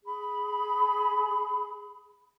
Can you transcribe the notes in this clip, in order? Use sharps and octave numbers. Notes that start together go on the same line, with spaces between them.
G#4 B5